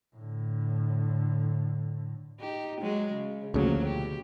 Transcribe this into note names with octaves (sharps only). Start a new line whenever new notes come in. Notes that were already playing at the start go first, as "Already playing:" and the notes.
A2 D3
D#4 G4
F#3 G#3
C#3
D2 C#3 F3 F#3 A#3
B2 G4